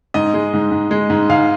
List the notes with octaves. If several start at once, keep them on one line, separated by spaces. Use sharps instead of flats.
G#2 D#5
G#3
G#2
G#2
G#3
G#2
G#2 F5